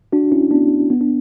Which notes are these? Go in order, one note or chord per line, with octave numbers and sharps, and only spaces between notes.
D4 F#4
C#4 E4
B3 D4
B3
D4